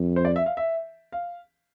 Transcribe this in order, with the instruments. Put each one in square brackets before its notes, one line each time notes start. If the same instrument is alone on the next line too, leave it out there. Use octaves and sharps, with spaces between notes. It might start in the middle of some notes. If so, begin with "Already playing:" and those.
Already playing: [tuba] F2
[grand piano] C5
D5
E5
F5
E5
F5